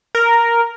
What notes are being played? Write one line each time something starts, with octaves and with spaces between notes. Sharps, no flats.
A#4